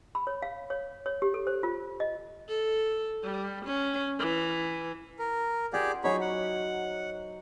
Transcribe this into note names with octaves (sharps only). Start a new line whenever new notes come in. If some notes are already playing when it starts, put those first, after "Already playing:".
B5
C#5
F5
C#5
C#5
G4
A4
C5
F4
D#5
A4
G3
C#4
E3
A#4
G4 G#4 D5 F#5 C6
F#3 D#4 G#4 C5 C#5 B5
F#5